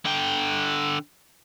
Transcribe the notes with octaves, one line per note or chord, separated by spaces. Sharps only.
D3 G5